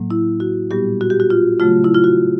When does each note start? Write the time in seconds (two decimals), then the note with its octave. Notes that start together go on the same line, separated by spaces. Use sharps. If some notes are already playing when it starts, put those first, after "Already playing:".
Already playing: A2 F#3 A#3
0.11 E4
0.40 F#4
0.71 A#2 G3 B3 G4
1.01 F#4
1.10 G4
1.20 F#4
1.30 F4
1.60 C#3 F#3 A3 F4
1.84 E4
1.94 F4
2.04 F#4